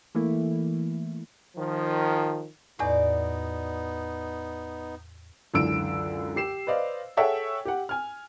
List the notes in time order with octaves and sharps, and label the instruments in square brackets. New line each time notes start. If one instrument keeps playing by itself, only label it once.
[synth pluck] E3 A3 A#3 E4
[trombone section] D#3 F3
[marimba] E2 A2 [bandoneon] B3 D#4 [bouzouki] F#4 D5
[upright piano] C#2 F#2 D3 E3 E6 D7
G4 C7 E7
B4 C5 D5 D#5 F5
G#4 A4 C#5 E5 F#5 G5
G4 F#5
G#5 F6